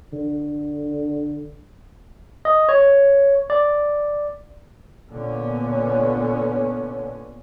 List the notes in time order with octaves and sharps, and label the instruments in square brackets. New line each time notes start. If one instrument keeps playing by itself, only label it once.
[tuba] D3
[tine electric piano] D#5
C#5
D5
[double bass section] A#2 D3 B3 C#4